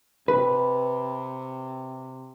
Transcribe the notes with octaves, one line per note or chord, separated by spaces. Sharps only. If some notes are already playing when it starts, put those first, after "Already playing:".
C3 B4